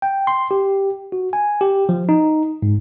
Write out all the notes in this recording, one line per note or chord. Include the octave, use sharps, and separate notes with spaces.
G5
C6
G4
F#4
G#5
G4
F3
D#4
G#2